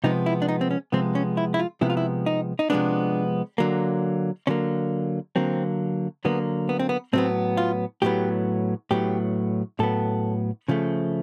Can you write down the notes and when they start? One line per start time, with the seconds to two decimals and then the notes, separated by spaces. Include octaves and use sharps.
0.04 C3 F3 G#3 B3 D#4
0.26 E4
0.42 D4
0.49 D#4
0.61 C4
0.71 C#4
0.92 C3 F3 G#3 B3 C4
1.15 C#4
1.37 E4
1.54 E4
1.59 F4
1.81 C3 F3 G#3 B3 E4
1.90 F4
1.97 E4
2.26 D#4
2.59 D#4
2.70 C3 F3 G#3 B3 D4
3.58 D3 F#3 A#3
4.47 D3 F#3 A#3 C#4
5.36 D3 F#3 A#3 C4
6.25 D3 F#3 A#3 B3
6.69 B3
6.79 C4
6.89 B3
7.13 A2 F#3 B3 C4
7.57 F4
8.02 A2 F#3 B3 G4
8.91 A2 F#3 B3 G4
9.79 A2 F#3 B3 A4
10.68 C#3 F3 A3